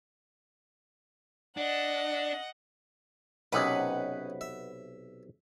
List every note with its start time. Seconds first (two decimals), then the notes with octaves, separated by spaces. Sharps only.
1.57 D4 D#5 F#5
3.52 B1 C3 C#4 D#4 A#4 B4 D#5 F#5
4.41 E5